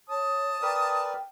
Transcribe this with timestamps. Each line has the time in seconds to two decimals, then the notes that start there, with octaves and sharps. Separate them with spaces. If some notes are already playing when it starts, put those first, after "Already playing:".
0.09 C#5 A5 D#6
0.62 A#4 B4 D5 G5